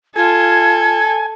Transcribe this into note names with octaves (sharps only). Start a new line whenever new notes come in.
F4 A4 G#5 G#6